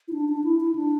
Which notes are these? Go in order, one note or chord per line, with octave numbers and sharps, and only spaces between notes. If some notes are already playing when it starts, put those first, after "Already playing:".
E4
D4
D4
E4
E4
D4